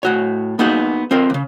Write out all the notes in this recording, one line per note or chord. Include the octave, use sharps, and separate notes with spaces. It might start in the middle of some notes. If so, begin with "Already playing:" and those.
A2 F#4 C#5
A#3 B3 D#4 F#4 G#4 B4
C4 F4 A#4
D#2 C#3